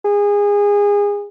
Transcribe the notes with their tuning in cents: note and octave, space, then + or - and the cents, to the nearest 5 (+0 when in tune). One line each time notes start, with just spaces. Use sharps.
G#4 -25